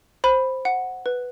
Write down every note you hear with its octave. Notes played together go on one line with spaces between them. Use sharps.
C5 B5
F#5
B4